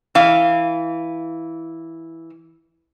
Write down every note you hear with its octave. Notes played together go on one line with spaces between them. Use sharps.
E3 F5